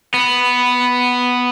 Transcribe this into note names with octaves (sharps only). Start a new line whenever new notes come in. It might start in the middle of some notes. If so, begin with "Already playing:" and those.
B3